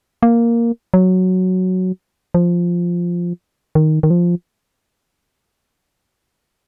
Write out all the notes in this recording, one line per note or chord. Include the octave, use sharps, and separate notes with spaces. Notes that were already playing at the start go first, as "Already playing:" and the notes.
A#3
F#3
F3
D#3
D#3
F3